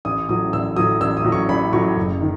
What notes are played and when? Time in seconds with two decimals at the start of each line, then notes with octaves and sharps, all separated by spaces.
0.05 A1 D#6
0.29 A2 F#3 D#6
0.53 A1 E6
0.76 A2 F#3 D#6
1.01 A1 E6
1.17 D#6
1.25 A2 F#3
1.32 C#6
1.49 A1 B5
1.73 A2 F#3 C#6
1.96 F#1
2.21 D#3